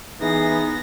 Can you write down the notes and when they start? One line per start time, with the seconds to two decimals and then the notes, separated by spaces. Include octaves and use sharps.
0.21 E3 B3 D#4 G#4 A#6